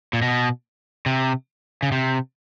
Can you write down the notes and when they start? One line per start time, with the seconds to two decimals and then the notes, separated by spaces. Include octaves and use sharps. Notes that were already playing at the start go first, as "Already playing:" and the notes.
0.13 A#2
0.22 B2
1.06 C3
1.83 C#3
1.92 C3